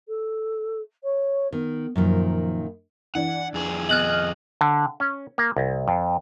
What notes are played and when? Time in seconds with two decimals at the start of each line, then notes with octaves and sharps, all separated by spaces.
0.08 A4
1.03 C#5
1.52 D#3 B3
1.96 F#2 A#2 D#3 F3
3.15 E3 D4 F#5
3.54 F2 G#4
3.89 B2 D#5 F6 F#6 F#7
4.61 D3
5.00 C#4
5.38 A#3
5.57 C2
5.88 F2